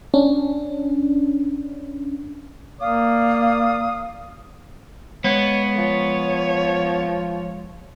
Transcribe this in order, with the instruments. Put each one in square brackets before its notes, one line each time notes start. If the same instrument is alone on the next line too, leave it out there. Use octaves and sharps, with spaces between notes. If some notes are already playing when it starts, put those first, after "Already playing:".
[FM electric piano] C#4 D4
[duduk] A#3 [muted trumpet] D5 [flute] F5 [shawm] D#6
[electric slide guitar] G#3 F5 [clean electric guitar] B3 [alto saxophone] C#5
[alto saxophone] F3 [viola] C#5